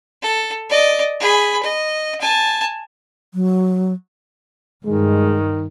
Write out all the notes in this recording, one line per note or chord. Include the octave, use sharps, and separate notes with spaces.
A4
D5 D#5
G#4 B5
D#5
G#5 A5
F#3
G2 D#3 G#3